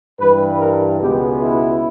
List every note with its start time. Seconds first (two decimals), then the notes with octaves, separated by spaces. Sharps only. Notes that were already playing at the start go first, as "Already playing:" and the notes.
0.20 G2 E3 G3 B4
0.60 A#4
1.01 C#2 B2 G#3 B3 G4
1.41 E4